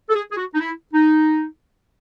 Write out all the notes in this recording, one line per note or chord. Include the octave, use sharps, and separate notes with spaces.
A4
G#4
G#4
F#4
D#4
E4
D#4